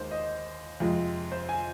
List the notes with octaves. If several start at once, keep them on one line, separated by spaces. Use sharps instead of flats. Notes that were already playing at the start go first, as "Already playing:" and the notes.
Already playing: D#2 D#3 G#3 C5
D#5
F2 C3 F3 G#3
C5
G#5